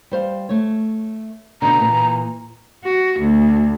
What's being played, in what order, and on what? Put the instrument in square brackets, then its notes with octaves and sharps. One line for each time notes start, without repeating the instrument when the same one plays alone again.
[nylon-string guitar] G3 C5 F5
A3 C#5
[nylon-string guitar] B2 D3 [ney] A#5
[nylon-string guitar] A#2 E3
[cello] F#4
D2